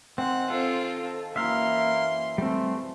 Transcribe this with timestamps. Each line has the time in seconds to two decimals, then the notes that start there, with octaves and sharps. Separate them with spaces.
0.18 D#3 C4 F#5 G#5 C6
0.50 C4 F4 A4
1.36 F#2 E3 A#3 E5 F5 C6
2.38 G3 A3 C4